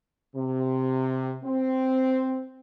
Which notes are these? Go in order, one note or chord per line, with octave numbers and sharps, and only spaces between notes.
C3
C4